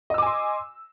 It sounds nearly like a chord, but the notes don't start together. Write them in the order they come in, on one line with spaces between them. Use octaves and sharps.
D#5 E6 D6 G#5 C6